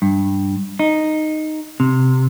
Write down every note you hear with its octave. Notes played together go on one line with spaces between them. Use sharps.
G2
D#4
C3